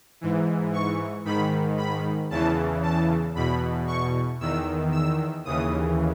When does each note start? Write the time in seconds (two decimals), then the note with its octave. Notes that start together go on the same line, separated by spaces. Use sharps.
0.21 G#2 E3
0.73 C#6
1.25 G#2 D#3 B5
1.78 B5
2.30 E2 C#3 E3 A5
2.83 A5
3.35 E2 B2 B5
3.87 C#6
4.40 E2 D#3 E6
4.92 E6
5.45 D#2 C#3 E3 D#6